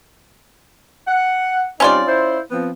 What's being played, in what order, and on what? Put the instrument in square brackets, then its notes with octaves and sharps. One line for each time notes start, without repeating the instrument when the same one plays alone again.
[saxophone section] F#5
[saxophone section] G3 C4 D#4 [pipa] C#4 F4 D5
[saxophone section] E4 C5
F3 B3 C4